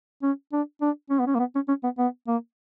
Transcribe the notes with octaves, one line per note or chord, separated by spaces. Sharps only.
C#4
D4
D4
C#4
B3
C#4
A#3
B3
C#4
C#4
B3
B3
A#3